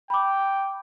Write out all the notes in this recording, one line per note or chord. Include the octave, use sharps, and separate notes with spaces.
G5 B5 D6